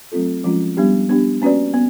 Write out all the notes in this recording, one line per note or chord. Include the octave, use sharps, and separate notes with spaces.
F#3 A3 C4 F4 A4
F3 G#3 C#4 F4
G3 B3 D4 G4
B3 D4 G4
A#3 C#4 F#4 B4 D5
B3